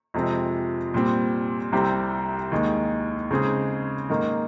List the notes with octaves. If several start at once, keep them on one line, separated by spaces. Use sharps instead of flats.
F2 C3 F3 G#3 C4
A#2 G3 C4
C2 C3 G3 C4 G4
D#2 D#3 G#3
C#3 G#3 C4 D#4 G#4
G#2 D#3 A#3 D#4